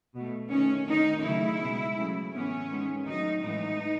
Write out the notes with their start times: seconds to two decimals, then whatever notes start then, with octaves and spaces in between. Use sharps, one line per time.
0.15 B2 A3
0.51 D#3 A3 C#4
0.88 D#3 A3 D#4
1.25 C#3 F#3 A3 E4
1.61 B2 G#3 B3
1.98 C#3 F#3 A3
2.34 A2 E3 B3 C#4
2.71 D#3 G#3 B3
3.07 D#3 F#3 A3 D#4
3.43 A2 E3 G#3 B3 D#4